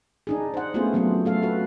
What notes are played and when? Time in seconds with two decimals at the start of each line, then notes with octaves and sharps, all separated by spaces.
0.27 D4 D#4 G#4
0.54 C5 F#5
0.74 A3 B3 C#4 F4 G#4 C5
0.94 F#3 A3 B3 C4 F4
1.25 A3 A4 F5
1.42 F#4 A4 B4